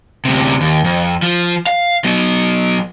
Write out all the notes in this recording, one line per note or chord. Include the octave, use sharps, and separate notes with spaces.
D2 C3
D#2
F2
F3
F5
F#3 B3